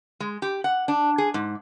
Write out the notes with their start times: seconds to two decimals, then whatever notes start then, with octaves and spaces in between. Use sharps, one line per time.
0.20 G#3
0.42 G4
0.64 F#5
0.88 D4
1.18 G#4
1.34 G#2